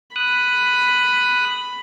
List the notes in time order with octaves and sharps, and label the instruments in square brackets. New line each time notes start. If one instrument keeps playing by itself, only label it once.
[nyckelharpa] B5 [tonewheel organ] D#6 F#6